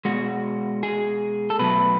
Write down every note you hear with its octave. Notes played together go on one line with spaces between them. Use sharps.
B2 G#3 F#4
G#4
A4
B2 F#3 A3 B4